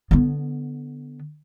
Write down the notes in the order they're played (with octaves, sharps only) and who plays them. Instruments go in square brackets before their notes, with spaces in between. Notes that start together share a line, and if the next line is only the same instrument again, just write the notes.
[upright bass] D3 B3